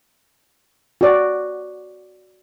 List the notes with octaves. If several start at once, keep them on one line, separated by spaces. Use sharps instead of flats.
F#4 D5